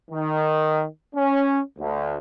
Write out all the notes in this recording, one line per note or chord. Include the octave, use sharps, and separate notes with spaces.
D#3
C#4
D2